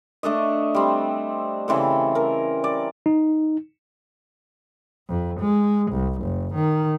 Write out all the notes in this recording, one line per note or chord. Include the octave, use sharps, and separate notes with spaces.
A3 D4 A4 D#5
G3 C4
C#3 E3 C4 A4
A#4
D5
D#4
F2
G#3
C2
F#1
D#3